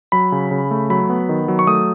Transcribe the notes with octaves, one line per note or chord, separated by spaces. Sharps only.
F#3 B5
C#3
C#3
A3
F#3 B5
B3
D#3
F#3
C#6
A3 D#6